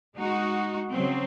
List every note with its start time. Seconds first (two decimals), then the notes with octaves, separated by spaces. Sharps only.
0.16 G#3 D#4 F#4
0.91 C#3 F#3 C4